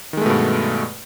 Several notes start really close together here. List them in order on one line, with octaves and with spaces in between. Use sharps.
D#3 G#3 A3 B2 G2